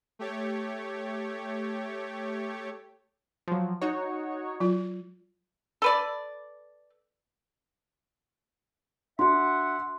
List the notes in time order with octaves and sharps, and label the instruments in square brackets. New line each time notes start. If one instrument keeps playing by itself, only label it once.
[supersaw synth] A3 G4 C#5
[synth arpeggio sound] F3 F#3
D#4 F#4 C#5
[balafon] F#3 F4
[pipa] A4 B4 D5
[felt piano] D4 F#4 [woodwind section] E5 F#5 [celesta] C6